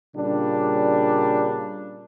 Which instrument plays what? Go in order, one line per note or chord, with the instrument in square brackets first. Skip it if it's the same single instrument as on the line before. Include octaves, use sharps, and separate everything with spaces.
[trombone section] A#2 C#3 G3 D4